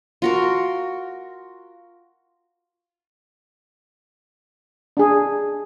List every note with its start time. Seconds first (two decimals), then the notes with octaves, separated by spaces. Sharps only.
0.22 F4 F#4 A#4
4.97 D4 G#4